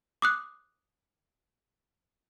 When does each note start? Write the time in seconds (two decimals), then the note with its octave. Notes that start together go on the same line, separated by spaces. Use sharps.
0.22 D6 D#6 F#6